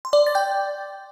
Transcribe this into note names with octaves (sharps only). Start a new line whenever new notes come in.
C6
D5 D6
A6
G5 G6